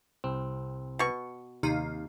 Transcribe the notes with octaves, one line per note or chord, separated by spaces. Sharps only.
C2 C4
B2 C#6
D#2 C3 D#4 F5